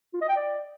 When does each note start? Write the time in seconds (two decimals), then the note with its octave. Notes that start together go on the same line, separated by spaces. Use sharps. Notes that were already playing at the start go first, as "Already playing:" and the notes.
0.13 F4
0.21 D#5
0.29 G5
0.36 D5